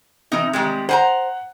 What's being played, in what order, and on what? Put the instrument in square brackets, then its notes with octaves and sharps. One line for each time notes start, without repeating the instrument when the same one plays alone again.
[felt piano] C3 [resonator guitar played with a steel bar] E3 D#4
[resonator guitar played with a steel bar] D#3 G3 G#3
[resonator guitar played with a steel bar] C5 G#5 A#5 [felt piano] F#5